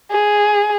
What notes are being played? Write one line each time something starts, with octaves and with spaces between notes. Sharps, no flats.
G#4